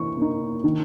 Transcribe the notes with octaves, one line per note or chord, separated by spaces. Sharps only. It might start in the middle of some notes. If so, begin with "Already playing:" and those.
Already playing: E3 A#3 C#6
A#3 D#4
D#3